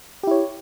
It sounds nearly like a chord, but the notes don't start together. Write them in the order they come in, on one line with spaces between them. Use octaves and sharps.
G4 E4 C#5